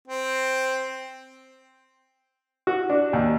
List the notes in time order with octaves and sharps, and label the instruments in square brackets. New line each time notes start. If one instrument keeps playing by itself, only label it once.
[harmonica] C4
[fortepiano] F#4
D4
D#2